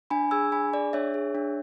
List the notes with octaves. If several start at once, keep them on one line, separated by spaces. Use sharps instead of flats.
D4 G#5 B5
G#4 E6 G#6
D4 G#5 B5
G#4 D5
D4 C#5 E5
G#4
D4